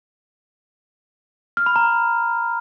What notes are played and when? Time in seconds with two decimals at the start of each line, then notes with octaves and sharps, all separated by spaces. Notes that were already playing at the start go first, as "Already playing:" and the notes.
1.57 F6
1.66 B5
1.76 A#5